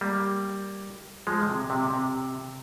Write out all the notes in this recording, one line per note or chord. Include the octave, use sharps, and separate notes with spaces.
G3 A#3
F3 G#3
C3
C3
C3